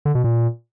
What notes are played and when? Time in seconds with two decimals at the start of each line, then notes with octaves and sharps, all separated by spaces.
0.05 D3
0.15 B2
0.24 A#2